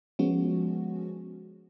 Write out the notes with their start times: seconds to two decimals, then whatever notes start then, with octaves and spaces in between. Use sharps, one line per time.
0.19 F3 G#3 B3 C#4 F#4